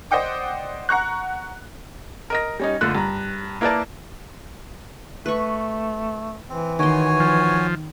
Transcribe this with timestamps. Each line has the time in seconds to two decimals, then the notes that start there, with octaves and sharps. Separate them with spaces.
0.11 C5 D5 D#5 F#5 G5 D6
0.89 F#5 A#5 C#6 F#6
2.30 A#4 D#5 A#6
2.60 G3 C#4 D#4
2.81 F#1 D3 A3 F4 F#6
2.95 G2 A#5
3.61 A#3 E4 A#4 B4 D5 A5
5.26 A3 B4 C#6
6.49 E3 C4
6.79 D#3 F#4 C#5 G#5 C6
7.20 F3